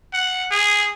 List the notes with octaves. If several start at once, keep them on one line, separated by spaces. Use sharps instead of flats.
F#5
G#4